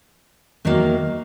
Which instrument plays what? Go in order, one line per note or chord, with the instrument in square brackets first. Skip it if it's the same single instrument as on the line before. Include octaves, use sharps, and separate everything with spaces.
[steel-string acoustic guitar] E2 D#3 F#3 A#3